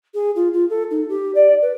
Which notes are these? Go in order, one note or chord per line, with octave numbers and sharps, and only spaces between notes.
G#4
F4
F4
A4
D#4
G4
D5
B4